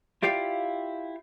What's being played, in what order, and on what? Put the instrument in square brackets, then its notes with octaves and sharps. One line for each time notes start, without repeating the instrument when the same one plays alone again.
[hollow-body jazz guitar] E4 F4 G4 D5 F5 G5